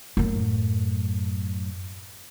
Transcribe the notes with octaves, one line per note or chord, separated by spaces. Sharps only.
F#2 A2